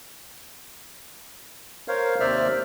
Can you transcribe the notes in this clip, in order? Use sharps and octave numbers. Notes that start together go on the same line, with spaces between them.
A#4 C5 C#5 F5
D#2 C3 C5 D5 E5 F6